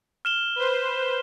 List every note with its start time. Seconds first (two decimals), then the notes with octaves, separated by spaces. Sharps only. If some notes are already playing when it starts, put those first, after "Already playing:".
0.25 F6 E7 G7
0.56 B4 C5